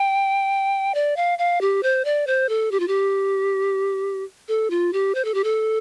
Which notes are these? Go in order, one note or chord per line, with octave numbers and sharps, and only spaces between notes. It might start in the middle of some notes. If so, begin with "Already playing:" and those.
Already playing: G5
D5
F5
F5
G4
C5
D5
C5
A4
G4
F4
G4
A4
F4
G4
C5
A4
G4
A4